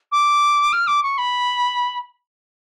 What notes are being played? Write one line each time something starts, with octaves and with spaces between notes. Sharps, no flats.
D6
F6
D6
C#6
B5